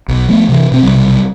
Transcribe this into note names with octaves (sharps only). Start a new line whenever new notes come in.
B1
F3 A3 B3
C3 E3
B2 C4
B1 E2 C3 G3